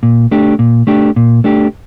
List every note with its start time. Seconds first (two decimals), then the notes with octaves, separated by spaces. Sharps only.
0.03 A#2
0.31 A3 D4 G4
0.59 A#2
0.87 A3 D4 G4
1.16 A#2
1.44 A3 D4 G4